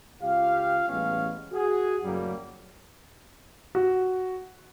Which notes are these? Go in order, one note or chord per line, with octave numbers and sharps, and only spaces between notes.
C#2 F4 G4 F5
A1 G3 G#3 B3 C#4 F5
F#4 G#4
F#2 A2 C#3 F#3 G3 A#3
F#4